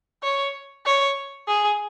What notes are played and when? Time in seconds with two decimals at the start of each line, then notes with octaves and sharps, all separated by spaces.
0.23 C#5
0.86 C#5
1.48 G#4